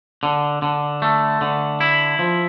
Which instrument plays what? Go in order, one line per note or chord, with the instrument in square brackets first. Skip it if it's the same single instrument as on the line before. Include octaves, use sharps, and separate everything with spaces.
[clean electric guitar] D3
D3
A3
D3
E4
F3